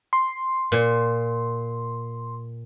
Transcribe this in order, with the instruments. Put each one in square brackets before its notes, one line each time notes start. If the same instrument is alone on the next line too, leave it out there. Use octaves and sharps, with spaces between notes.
[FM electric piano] C6
[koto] A#2